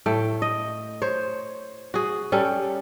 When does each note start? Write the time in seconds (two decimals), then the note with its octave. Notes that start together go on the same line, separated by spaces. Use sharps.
0.06 A2 A3 G5
0.42 D#5
1.02 C5 C#5
1.94 F#4 G#4
2.32 G3 C#4 A4